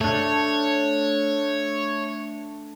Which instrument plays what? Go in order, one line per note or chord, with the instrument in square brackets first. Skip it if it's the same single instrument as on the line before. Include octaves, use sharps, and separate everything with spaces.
[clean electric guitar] A3 D4 [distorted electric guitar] C#5